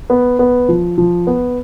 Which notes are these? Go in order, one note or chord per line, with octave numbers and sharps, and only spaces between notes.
B3
B3
F3
F3
B3